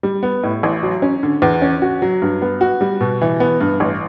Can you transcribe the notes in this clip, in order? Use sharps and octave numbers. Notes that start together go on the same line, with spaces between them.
G3
B3
A2
A1
F#3
C#4
D3
E2
C#4
F#4
F#3
G2
B3
F#4
G3
B2
E3
B3
G2
A1